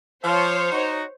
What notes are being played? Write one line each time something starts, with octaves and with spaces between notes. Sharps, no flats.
F3 C5 C#5 F5
D#4 F#4